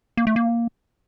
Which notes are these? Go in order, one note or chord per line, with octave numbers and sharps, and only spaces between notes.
A#3
A3
A#3